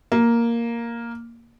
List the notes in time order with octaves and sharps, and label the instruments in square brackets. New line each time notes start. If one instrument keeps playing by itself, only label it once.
[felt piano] A#3